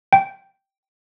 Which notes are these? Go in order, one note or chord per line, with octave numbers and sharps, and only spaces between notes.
G5